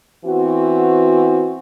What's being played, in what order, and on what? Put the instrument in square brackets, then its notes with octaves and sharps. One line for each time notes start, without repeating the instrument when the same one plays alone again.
[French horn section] E3 B3 C4 F#4